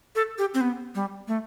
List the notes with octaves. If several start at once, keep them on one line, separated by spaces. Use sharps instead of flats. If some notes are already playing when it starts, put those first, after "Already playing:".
A4
G4
C4
B3
G3
A3